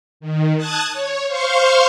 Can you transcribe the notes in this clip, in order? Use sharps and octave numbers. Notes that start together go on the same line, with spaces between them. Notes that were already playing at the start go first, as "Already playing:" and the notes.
D#3
A5 D#6 F#6 G#6 A6
C#5
C5 F5 C6 C#6